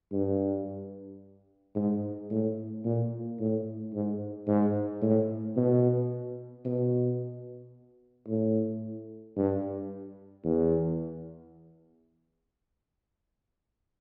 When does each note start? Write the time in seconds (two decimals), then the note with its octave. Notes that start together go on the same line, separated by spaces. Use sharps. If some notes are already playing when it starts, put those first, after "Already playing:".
0.12 G2
1.76 G#2
2.31 A2
2.84 A#2
3.39 A2
3.94 G#2
4.47 G#2
5.02 A2
5.56 B2
6.65 B2
8.28 A2
9.37 G2
10.45 E2